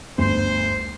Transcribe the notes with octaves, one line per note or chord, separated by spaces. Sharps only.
G1 D2 C5